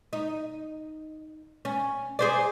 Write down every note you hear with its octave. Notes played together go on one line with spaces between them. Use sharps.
D#4
C#4
G#4 C5 D5